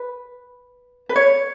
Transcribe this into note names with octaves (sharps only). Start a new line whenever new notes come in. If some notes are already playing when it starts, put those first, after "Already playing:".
Already playing: B4
B4
C#5